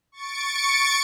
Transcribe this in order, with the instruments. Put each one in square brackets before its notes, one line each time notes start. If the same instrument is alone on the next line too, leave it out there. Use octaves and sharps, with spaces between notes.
[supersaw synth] C#6 A6 C#7 D7